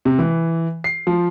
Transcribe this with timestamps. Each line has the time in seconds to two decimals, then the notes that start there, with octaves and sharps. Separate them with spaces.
0.05 C3
0.19 E3
0.84 C7
1.07 F3